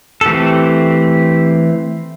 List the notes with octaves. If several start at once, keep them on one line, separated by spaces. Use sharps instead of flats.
A4
E3 A3 C4 G4